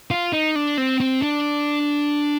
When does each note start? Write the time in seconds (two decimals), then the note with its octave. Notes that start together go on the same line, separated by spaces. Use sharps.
0.11 F4
0.33 D#4
0.56 D4
0.78 C4
1.00 C4
1.22 D4